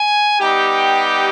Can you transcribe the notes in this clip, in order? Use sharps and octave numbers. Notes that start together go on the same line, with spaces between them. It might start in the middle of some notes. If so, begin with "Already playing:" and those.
Already playing: G#5
G3 B3 D#4 G4
G5